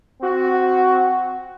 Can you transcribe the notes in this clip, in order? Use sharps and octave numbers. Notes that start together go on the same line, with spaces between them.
C4 F#4